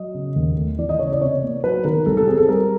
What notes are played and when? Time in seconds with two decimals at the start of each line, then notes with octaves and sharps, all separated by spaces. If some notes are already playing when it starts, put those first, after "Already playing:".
Already playing: F#3 D#5
0.14 C#3
0.36 D#2
0.57 A3
0.78 E3 D5
0.89 D#5
0.99 C#3 C#5
1.12 D5
1.21 C3 C#5
1.43 A#3
1.64 F#3 B4
1.84 D#3 A#4
2.06 C2 A4
2.17 A4
2.27 C4 G#4
2.38 A4
2.49 G3 A#4